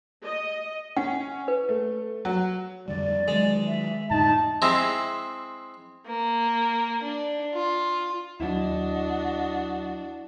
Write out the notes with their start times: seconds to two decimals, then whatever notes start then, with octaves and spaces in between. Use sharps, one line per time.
0.24 D#5
0.97 C#4 F#5
1.48 B4
1.69 A3
2.25 F#3
2.88 F2 D3 G3 D5
3.28 D#3 F#3 G#3
3.67 E5
4.10 F2 A2 D3 D#4 A5
4.62 G#3 C4 E4
6.06 A#3
7.02 D4
7.54 F4
8.40 D#2 F#3 D4 E4 F#4 D#5